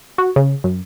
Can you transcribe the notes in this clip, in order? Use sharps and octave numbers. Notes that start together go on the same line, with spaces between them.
F#4
C#3
F#2